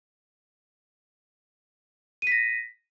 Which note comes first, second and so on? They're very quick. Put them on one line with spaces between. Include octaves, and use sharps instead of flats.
D#7 B6 A#6